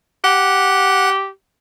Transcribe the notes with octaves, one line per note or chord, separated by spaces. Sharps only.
G4 F#5